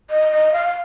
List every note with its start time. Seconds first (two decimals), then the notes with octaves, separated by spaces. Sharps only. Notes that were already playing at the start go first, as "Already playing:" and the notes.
0.10 D#5
0.31 D#5
0.53 F5